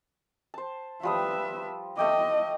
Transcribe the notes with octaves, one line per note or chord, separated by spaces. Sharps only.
C5 A5
F3 G3 B4 E5 D#6
A3 D#5 G5 D6